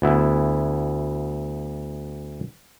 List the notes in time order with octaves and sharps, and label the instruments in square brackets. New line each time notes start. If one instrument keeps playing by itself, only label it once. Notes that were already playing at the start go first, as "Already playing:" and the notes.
[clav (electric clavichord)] D2 B3 E4 B4